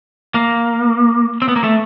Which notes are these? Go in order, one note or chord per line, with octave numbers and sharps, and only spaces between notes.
A#3
C4
B3
A#3
A3